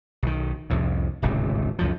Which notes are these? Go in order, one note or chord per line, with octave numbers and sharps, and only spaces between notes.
B1 D#3
C2 F2 A2
D1 G#1 C#2 C3
C#2 F#2 F3